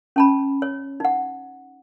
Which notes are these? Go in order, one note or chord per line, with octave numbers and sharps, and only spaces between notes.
C#4 A5 B5
C#5
D#4 F#5